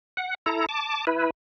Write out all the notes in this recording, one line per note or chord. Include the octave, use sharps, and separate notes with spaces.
F#5
E4 A4 A#5
A5 D6
E4 B4